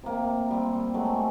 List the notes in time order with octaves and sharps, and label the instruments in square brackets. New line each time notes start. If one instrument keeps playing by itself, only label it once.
[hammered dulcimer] C3 A#3
G3 C4
F#3 G#3 A3